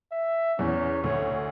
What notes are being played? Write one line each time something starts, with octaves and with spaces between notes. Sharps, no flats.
E5
E2 C#4
D2 C#5